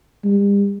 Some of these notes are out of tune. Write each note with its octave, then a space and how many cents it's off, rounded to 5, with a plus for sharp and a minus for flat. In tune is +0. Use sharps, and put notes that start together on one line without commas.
G3 +40